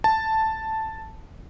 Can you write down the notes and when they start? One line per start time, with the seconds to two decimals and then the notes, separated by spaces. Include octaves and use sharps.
0.04 A5